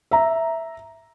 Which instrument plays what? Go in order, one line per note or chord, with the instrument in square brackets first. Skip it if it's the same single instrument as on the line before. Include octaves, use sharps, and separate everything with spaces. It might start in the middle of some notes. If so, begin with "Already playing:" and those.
[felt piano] E5 A#5